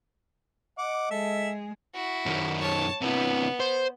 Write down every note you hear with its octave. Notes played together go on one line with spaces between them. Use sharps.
D#5 F#5 D6
G#3 G#4 A4 E5
E4 F#4
F#2 D#3
C#5 A5
C3 E3 B3
C5